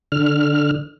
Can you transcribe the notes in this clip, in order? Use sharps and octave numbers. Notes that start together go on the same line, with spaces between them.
D3 F6